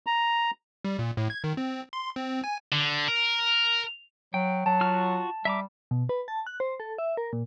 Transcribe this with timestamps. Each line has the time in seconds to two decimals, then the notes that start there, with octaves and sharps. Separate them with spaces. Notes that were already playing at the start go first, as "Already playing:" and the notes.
0.06 A#5
0.85 G3
0.99 A#2
1.17 A2
1.30 G#6
1.44 D#3
1.57 C4
1.93 C6
2.16 C4
2.44 G#5
2.72 D3
3.08 A#4
4.34 F#3 G5
4.66 F#3 A5
4.81 F4 F#4 F6
5.45 G3 E5 A#5 D6
5.91 B2
6.09 B4
6.28 A5
6.47 F#6
6.60 C5
6.80 A4
6.98 E5
7.17 A#4
7.33 A#2